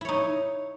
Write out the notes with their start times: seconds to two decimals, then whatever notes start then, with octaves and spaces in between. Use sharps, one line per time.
0.01 E4
0.05 C#5
0.09 D#4